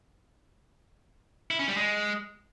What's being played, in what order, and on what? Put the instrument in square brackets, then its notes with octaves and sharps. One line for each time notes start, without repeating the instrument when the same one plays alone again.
[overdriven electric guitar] E4
C#4
G3
G#3